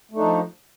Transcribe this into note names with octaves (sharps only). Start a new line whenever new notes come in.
F3 A3 D4 D#4